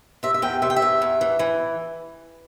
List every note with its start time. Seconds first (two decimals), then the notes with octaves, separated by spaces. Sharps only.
0.23 C3 E5
0.34 E5
0.42 E2 G5
0.62 C3 E5
0.70 G5
0.76 E5
0.82 E2
1.02 E2
1.21 E3
1.39 E3